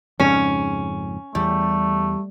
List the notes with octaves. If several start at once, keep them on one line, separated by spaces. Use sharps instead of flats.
F2 G#2 C#3 C#4
E2 G3 A3